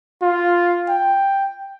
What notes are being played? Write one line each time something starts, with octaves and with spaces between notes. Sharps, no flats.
F4
G5